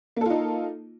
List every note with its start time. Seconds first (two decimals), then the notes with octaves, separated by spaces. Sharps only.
0.17 A#3
0.21 A4
0.26 F4
0.30 D#4